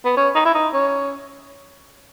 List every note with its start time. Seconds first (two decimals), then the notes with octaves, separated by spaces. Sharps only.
0.05 B3
0.17 C#4
0.35 D#4
0.45 E4
0.54 D#4
0.73 C#4